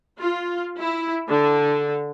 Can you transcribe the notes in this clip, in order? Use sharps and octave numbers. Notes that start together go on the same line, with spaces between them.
F4
E4
D3